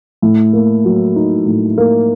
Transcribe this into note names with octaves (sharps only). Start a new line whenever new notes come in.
A2
A#3
F#3
D#4
A2
A#3